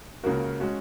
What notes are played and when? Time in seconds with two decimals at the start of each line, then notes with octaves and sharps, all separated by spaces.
0.23 C#2 C#3 A#3 F#4 A#4
0.60 G#3 C#4 F#4